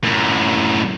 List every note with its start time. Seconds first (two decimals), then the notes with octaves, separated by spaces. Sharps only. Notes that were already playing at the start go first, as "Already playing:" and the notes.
0.04 F#2 A2